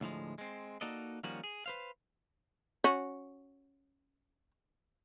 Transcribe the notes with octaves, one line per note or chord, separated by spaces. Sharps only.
D2 A2 F3 G#3
G#3 C4
A#3 D#4 F#4 A4 D5 D#5
D#3 F3 G3 A#3 C#4 F#4
G#4
B4 C5 F5
C#4 F#4